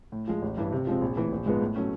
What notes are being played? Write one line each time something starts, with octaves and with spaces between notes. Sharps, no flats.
A2
F3 G#3
A1
G2 E3
C3
F3 G#3 C4
A#1
A2 E3
A#1
G#2 F3 G#3 B3
A2
F#3 A3 C#4